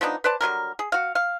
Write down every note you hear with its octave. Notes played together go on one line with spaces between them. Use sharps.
F3 B3 D4 D#4
B4 C5 D5 A5
D3 F#3 G3 A#4
G#4
F#4 F5
F5